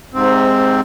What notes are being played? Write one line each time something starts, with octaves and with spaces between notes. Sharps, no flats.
G#2 C3 C4